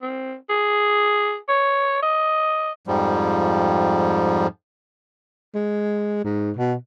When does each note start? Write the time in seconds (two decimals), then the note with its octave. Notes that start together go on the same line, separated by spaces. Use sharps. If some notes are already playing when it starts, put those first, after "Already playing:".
0.02 C4
0.49 G#4
1.49 C#5
2.03 D#5
2.87 F2 G#2 F3 G3
5.55 G#3
6.25 G#2
6.57 B2